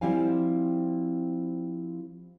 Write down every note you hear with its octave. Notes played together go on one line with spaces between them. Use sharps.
F3 G3 C4 E4 F5 G#5